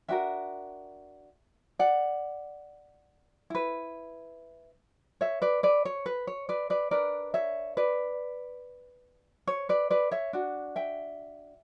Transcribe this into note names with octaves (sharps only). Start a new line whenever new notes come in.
D4 F#4 A#4 E5 G5
D5 F#5
E4 B4
C#5 E5
B4 D5
B4 D5
C#5
B4
C#5
B4 D5
B4 D5
D4 A#4 B4 D5
C#5 E5
B4 D5
C#5
B4 D5
B4 D5
C#5 E5
D4 F#4
E5 G5